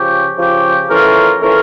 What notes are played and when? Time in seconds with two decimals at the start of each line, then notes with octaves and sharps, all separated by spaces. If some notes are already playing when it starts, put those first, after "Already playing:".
Already playing: C#3 F3 C#4 G4
0.37 C#3 F3 C#4 G4
0.89 E3 A3 C#4 F4 A#4
1.42 E3 A3 C#4 F4 A#4